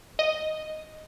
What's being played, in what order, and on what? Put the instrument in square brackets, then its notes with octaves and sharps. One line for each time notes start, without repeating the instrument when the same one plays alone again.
[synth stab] D#5